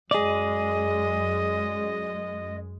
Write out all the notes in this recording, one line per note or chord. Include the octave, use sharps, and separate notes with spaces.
F#2 G#3 G#4 D5 D#5